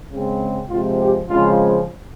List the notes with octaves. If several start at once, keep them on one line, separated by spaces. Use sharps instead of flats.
C#3 G#3 C4
C3 F3 G#3 C4 F4
G4
C#3 F3 G#3 C4 F4